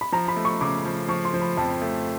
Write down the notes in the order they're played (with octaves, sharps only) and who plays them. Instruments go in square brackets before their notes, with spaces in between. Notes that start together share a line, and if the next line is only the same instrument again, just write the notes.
[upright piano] B5
[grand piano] F3 [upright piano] A#5
[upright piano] B5
[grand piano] A3
[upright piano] C#6
[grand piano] C#3 [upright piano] D6
[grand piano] F3
[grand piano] F3 [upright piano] C#6
[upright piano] C6
[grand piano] F3
[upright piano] B5
[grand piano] F2 [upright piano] A5
[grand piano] A3